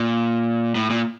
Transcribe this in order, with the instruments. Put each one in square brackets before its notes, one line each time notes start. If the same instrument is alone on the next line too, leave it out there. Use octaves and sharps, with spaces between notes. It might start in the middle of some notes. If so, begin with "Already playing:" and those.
Already playing: [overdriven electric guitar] A#2
A2
A#2